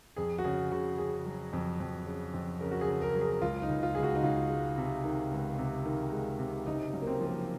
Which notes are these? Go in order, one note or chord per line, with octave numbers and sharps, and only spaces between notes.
F2 G#4
F#4
C#3 G#4
C#3 F#4
C#3 G#4
F#3
F2
F2
C#3
F2
C#3 A#4
F#4
G#4
C#3
A#4
F#3
G#4
C#2 F4
D#4
C#2
F4
C#2 G#4
F#4
D#4
C#2 F4
G#3
C3
D#3
C#2
C3
D#3
G#3
C3
F#1 D#4
F#2
A#3
C4
F3
A#3